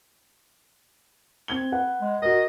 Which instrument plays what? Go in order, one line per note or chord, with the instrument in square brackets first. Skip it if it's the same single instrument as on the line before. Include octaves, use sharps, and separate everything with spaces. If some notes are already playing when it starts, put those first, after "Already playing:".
[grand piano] C4 G#6 G7
B4 F#5
[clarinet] G#3
[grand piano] F#4 A#4 [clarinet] D#5